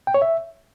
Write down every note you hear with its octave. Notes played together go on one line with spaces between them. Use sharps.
G5
C#5
E5